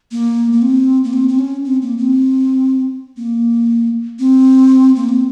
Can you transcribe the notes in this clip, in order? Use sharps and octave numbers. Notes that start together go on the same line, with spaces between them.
A#3
A#3
C4
A#3
C4
C4
C#4
C4
A#3
C4
A#3
C4
A#3
C4